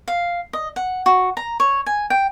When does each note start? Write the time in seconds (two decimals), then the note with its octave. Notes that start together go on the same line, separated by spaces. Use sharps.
0.08 F5
0.53 D#5
0.76 F#5
1.06 F#4
1.37 A#5
1.60 C#5
1.86 G#5
2.10 G5